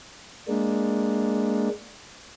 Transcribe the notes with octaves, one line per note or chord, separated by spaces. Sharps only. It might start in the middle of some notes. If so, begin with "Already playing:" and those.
G#3 A#3 D4